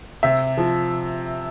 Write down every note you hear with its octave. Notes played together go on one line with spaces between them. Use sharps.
C3 E5
F3